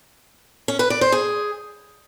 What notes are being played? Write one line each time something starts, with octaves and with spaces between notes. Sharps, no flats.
C#4
B4
D5
C5
G#4